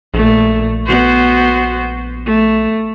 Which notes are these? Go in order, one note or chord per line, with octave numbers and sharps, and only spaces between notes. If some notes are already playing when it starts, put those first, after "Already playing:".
A#1 A#2 A3
B3 F#4 C5
A3